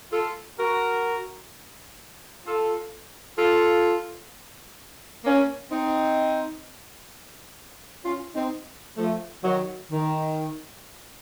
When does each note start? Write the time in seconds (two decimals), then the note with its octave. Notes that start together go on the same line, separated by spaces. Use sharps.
0.12 F4 A4
0.59 F#4 A#4
2.45 F4 A4
3.38 F4 A4
5.24 A#3 C#4
5.71 C4 D#4
8.03 C#4 F4
8.34 C4 D#4
8.97 F3 A3
9.43 D#3 F#3
9.89 D#3